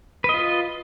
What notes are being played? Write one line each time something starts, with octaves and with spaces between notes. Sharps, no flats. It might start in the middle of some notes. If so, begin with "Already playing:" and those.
F4 B4 D#5